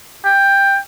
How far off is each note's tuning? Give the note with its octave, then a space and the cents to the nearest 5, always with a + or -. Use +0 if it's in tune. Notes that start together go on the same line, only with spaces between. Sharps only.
G5 +10